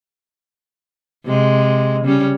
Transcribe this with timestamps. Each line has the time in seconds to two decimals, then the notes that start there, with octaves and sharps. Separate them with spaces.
1.25 C3 G#3
2.04 C#3 G3 C#4